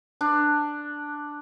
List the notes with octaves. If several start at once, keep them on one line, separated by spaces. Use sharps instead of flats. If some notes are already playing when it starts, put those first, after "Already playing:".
D4